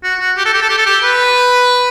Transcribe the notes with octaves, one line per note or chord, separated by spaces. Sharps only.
F#4
F#4
G4
A4
G4
A4
G4
A4
G4
B4